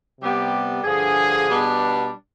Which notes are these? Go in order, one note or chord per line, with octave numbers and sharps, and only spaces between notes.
C3 G3 B3 G4
G2 D3 F3 G#4
B2 G3 B3 D4